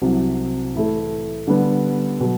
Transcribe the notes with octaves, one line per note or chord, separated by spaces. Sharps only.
C2 C3 F#3
A2 E3 A3 E4 A4
D3 G3 B3
B2 F#3